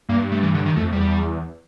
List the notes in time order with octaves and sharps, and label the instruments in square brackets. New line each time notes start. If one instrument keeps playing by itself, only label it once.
[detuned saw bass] G2 [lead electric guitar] A#3
[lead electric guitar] A3
E3
D3
D#3
[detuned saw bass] F2 [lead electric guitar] A3
[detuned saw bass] E2 [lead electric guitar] G3